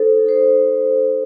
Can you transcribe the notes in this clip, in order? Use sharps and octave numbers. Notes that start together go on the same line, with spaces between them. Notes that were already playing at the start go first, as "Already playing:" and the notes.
Already playing: D#4 A4 C5
D#4 A4 C5